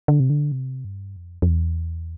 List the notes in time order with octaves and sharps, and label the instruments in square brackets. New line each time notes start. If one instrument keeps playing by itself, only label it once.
[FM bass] D3
C3
D3
C3
G2
F2
F2
E2